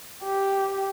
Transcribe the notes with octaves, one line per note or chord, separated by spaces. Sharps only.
G4